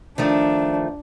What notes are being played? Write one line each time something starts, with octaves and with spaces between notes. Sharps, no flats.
D#3 F3 A3 D4